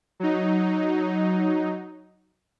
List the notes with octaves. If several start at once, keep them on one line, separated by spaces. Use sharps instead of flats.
F#3 D#4